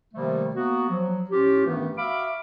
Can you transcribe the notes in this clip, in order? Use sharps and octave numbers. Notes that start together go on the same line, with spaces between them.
C3 D#3 F3 G3 A3 A#3
A#3 B3 F#4
F3 F#3
A2 C#4 F4 G4
G2 D#3 E3 A3 B3 C#4
F#4 E5 F5 B5 D6